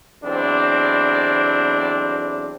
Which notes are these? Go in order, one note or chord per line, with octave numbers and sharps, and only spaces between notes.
B1 E2 C4 D4